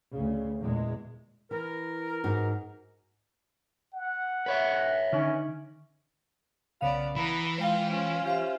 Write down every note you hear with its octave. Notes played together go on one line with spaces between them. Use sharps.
D2 C#3
E2 A#2 G#3
E3 A#4
G#2 D#4 F#4
F#5
B4 C#5 E5
D3 D#3 C#4 D#4
B1 C#3 B3 D5 F5
E3 B3 A#5 B5
G#3 F4 C5 F5 G5
C#4 F4
G4 C5 E5 F5